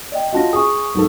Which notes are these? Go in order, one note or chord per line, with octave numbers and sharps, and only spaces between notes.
D5 D#5 G5
C#4 F4 F#4 D#5 A5 A#6
G#4 C#6 D#6
B1 G#2 A4